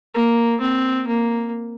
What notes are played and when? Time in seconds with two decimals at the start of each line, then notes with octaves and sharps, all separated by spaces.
0.14 A#3
0.61 C4
1.08 A#3